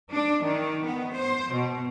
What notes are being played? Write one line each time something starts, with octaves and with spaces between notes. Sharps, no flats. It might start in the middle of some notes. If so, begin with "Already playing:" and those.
D4
D#3
B3
C5
B2